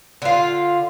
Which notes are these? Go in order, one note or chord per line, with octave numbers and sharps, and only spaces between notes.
D3 F4